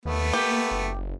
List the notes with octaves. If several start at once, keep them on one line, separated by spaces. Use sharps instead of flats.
D#2 A3 B3
A#3 G4
F#1